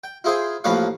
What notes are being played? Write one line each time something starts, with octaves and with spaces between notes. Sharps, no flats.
G5
E4 F4 G#4 C5 G5 G#5
A1 F3 A#3 B4 C#5 F5